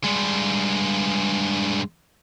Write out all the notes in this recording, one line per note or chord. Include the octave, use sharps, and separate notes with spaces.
G2 G#3